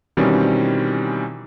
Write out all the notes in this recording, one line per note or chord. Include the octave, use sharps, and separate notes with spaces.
B2 D#3 E3 G3 C4 C#4